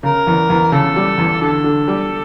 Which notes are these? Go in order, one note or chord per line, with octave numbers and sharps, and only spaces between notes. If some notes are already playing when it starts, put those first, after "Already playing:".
C#3 A#4
E2
E2
C#3 A4
G3
E2
D3 A4
D3
G3